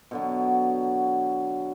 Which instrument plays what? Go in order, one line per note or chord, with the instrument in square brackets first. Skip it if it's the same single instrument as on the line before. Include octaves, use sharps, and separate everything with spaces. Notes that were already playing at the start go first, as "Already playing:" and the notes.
[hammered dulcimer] B2 D3 F#3